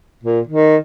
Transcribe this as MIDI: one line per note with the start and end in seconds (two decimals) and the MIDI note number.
0.24 0.40 46
0.48 0.76 51